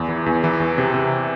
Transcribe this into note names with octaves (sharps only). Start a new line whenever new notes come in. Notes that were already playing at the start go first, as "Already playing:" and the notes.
Already playing: E2
E3
E2
E3
E2
C3
C3